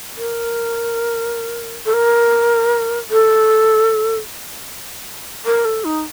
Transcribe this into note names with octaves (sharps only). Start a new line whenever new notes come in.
A#4
A4
A#4
A4
A#4
A4
D#4